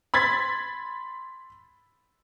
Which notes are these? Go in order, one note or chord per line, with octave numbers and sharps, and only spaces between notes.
B5 C6 G#6 A6 B6